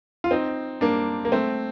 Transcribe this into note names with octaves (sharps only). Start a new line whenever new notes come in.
F4
C4 D#4
A#3 D4
A#3
A3 C4